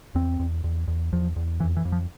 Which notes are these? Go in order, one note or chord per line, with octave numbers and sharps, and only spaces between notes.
E2 C4
E2
E2
E2
E2 F3
E2
F2 E3
E3
F2
F3